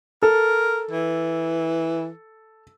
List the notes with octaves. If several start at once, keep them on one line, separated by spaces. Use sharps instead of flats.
A4 A#4
E3